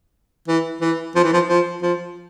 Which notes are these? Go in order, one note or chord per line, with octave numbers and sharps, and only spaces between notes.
E3
E3
F3
E3
F3
F3
F3